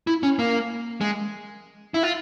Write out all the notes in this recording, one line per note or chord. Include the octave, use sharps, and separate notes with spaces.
E4
C#4
A#3
G#3
E4
F4